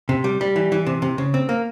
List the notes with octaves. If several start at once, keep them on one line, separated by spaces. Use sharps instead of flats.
C3
G3
G3
E3
E3
C3
C3
C#3
C4
A#3